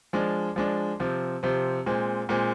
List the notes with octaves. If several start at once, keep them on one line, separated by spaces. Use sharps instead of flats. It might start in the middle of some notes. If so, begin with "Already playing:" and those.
F3 G#3 D4
F3 G#3 D4
C3 F3 C4
C3 F3 C4
A#2 G#3 C4
A#2 G#3 C4